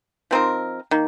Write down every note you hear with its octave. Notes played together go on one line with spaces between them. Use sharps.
F3 C4 D#4 A#4
D#3 A#3